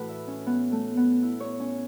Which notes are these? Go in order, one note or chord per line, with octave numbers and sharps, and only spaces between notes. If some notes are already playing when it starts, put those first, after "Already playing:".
Already playing: A2 E3 F#4 B4
E5
C#4
B3
A3
B3
E4
C#5
C#4